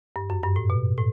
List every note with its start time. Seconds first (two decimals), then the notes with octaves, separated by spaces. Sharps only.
0.16 G2
0.30 F#2
0.43 G2
0.56 A2
0.70 B2
0.98 A2